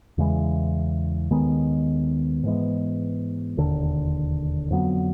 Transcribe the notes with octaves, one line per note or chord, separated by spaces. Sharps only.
E2 C#3 E3 G#3
D#2 D#3 G#3 B3
G#2 E3 G#3 B3
E1 D#2 D3
F2 D3 F#3 B3